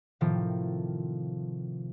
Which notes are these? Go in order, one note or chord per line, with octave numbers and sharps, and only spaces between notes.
A2 C3 D#3 F3